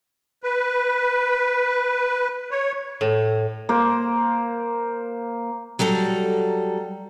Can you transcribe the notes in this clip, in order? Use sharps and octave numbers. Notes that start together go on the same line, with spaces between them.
B4
C#5
A2
A#3 C5
F#3 G3 A4 A#5